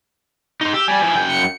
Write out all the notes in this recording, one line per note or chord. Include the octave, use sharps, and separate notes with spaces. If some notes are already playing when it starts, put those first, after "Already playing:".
D#4 C5
G4 E6
G3 D5 G#5
F3 E4
F#2 G5
C#7